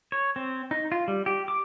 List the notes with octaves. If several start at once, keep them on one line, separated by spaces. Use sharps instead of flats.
C#5
C4
D#4
F4
G3
G4
D6